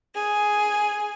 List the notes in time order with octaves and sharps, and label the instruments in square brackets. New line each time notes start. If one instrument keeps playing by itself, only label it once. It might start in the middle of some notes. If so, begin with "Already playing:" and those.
[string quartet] G#4